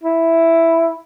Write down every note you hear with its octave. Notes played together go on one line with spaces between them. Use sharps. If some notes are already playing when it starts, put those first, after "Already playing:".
E4